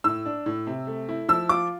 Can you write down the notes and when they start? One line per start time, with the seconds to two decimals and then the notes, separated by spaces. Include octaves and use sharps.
0.04 A2 E6
0.26 D4
0.46 A2
0.67 C3
0.87 A3
1.09 E4
1.28 F3 E6
1.49 F4 D6